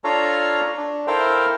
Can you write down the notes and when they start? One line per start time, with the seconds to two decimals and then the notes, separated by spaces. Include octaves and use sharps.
0.04 D4 F4 A4 C#5 F5 A#5
0.77 D4
1.07 E4 A4 A#4 C5 F5 G5